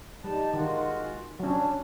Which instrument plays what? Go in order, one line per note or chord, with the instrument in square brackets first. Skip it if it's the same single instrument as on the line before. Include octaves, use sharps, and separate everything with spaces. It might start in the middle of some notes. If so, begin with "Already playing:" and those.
[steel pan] G3 [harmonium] D#4 A5
[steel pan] D#3 [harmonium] G#3 F4 F#4
[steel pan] F#3 C#4 [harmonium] D4